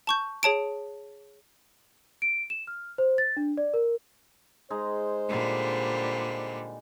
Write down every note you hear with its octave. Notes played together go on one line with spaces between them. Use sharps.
A5 C#6 G6
G#4 C#5 A5 D7
D7
E7
F6
C5
A6
D4
D5
A#4
G#3 D#4 C5
A#2 D3 G3